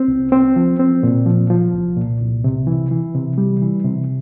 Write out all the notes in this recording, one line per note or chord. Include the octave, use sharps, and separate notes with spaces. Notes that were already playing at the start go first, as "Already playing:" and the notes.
Already playing: C4
C2
C4
F3
C4
A#2
F3
F3
C2
A#2
C2
C3
E3
E3
C3
G3
E3
C3